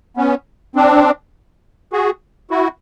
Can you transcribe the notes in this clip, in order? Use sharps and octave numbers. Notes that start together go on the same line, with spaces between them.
B3 C#4
C4 D4
F#4 G#4
E4 F#4